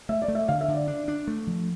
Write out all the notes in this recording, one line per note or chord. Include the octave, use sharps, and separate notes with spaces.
A3 E5
D5
A3
E5
D3 F5
E5
D3
D5
D4
D4
A3
F3